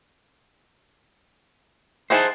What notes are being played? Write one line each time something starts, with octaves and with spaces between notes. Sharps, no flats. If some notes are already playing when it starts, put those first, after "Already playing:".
D#4 E4 G#4 C5 F#5 A5